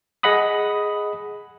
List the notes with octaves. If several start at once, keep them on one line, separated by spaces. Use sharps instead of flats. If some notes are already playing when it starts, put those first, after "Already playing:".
G#4 D#5 F#5 B5 D#6